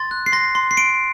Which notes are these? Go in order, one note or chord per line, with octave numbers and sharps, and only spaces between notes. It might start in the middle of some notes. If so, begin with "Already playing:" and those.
Already playing: C6 A6
F#6
C7
C6 A#6
C6
C7
C6 D7